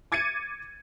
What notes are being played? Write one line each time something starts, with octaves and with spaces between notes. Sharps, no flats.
D6 G#6 A6 C#7 D#7